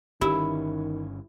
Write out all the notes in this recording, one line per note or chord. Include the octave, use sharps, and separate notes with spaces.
G1 D#3 C4 C#4 E4 G4